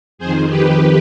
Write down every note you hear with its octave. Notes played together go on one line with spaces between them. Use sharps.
F2 D#3 G#4 C5
G4 B4